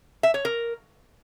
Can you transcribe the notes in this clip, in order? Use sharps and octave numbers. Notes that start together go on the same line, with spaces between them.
E5
C#5
A#4